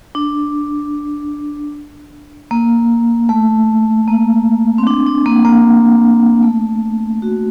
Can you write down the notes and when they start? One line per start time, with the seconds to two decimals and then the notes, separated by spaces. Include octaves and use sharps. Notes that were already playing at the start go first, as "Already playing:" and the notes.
0.15 D4
2.51 A#3
3.29 A3
4.08 A#3
4.78 C4
4.87 D4
5.07 D4
5.26 A#3
5.45 A#3
6.43 A3
7.22 F#4